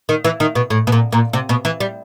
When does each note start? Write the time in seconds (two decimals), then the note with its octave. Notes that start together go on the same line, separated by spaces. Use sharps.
0.09 D#3
0.24 E3
0.40 D#3
0.55 B2
0.70 A2
0.87 B2
0.92 A#2
1.12 A#2
1.33 C3
1.49 B2
1.65 E3
1.80 G3